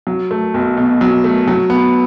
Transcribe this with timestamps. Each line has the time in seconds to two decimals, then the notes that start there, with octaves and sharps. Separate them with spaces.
0.07 F#3
0.31 A3
0.54 B1
0.77 B2
1.01 F#3
1.24 A3
1.48 F#3
1.70 B3